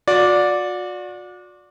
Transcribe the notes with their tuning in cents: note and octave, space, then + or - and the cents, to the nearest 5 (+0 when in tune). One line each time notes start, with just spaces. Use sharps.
F#4 -40 D5 -5